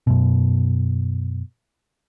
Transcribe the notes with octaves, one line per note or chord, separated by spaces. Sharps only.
F#2 B2